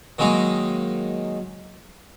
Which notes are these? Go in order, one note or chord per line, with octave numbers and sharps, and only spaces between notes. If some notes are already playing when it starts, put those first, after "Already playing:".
D#3 F#3 G#3 A#3 D#4